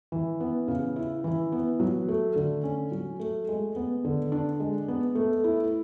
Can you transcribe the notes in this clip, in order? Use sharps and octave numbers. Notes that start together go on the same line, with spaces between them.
E3
B3
C#3
E4
E3
B3
F#3
A3
D3
C#4
F#3
A3
G#3
B3
D3
D4
G#3
B3
A3
E4